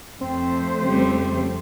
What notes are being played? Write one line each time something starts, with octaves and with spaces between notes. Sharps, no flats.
F2 A3 C4 C5
C#3 G3